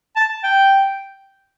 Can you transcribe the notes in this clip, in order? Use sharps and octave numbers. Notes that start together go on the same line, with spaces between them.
A5
G5